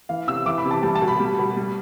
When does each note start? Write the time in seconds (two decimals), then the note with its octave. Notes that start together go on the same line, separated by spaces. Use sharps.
0.09 E3 F5
0.28 C3 E6
0.46 E3 D6
0.58 B5
0.65 C3
0.71 A5
0.83 G3 A5
0.95 A5
1.02 B2
1.08 B5
1.20 G3
1.39 B2
1.57 G3